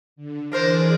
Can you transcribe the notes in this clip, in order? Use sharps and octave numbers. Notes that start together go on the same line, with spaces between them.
D3
E3 D4 G#4 A#4 C5 D5